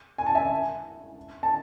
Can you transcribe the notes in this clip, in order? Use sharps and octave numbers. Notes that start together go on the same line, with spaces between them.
G#5
A5
E5 G#5
A5